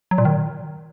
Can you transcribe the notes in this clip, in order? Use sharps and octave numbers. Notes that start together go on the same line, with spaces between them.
F#3
A#2
D#3